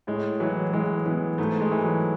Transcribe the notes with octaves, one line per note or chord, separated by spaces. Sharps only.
A2 G#3
E3 F#3
E3 G#3
E3 B3
G#2 A3
G#3
E3
F#3